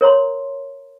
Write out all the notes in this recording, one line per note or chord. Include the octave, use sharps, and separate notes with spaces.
A#4 C#5 A#5 C6